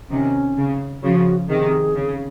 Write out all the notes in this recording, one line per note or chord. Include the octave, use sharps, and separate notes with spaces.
C3 D#3 C#4
C#3
C#3 F3 F#4
C3 D#3 G#4
C#3